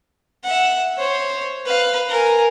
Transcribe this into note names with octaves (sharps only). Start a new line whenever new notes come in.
E5 F#5
C5 C#5
B4 F5
A#4 G#5